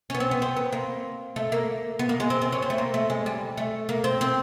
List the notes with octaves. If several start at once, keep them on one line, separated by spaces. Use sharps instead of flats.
C#4
B3
C4
B3
C4
B3
A#3
A3
A#3
B3
A#3
G#3
C4
C4
C#4
C4
A3
A#3
A3
G#3
G3
A3
A#3
C4
C4